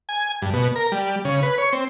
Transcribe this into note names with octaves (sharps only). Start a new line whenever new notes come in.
G#5
G2
B2
A#4
G3
C#3
B4
C#5
C4